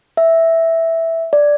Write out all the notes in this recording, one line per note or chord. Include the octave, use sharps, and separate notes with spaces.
E5
D5